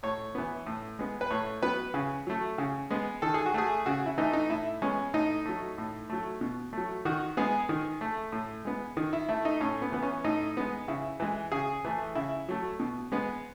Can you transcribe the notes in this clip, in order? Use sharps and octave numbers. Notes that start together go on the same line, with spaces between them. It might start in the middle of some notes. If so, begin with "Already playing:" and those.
A2 C#5
E3 B3
A2
G#3 B3
B4
A2 C#5
F#3 B3 B4
C#3
F#3 A3
C#3
G#3 B3
D#3 A4
G#4
F#4
A3 G#4
C#3 F#4
E4
E3 A3 D#4
D#4
A2 E4
G#3 B3 C#4
A2 D#4
F#3 A3
A2
F#3 A3
B2
F#3 A3
D#3 F#4
G#3 B3 G#4
D#3
A3
A2
G#3 B3
D#3
E4
A3 E4
D#4
A2 C#4
B3
E3 B3
C#4
A2 D#4
G#3 B3
C#3 E4
E3 G#3
C#3 G#4
E3 A3
C#3 E4
F#3 A3
B2
G#3 B3